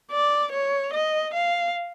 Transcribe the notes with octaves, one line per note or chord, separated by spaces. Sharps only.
D5
C#5
D#5
F5